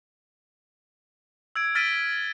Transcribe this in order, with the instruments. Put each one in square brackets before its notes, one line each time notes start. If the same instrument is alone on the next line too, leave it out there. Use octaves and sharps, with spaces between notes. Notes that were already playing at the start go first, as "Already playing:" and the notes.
[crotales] E6 G#6 D7
F6 A6 B6 D7 D#7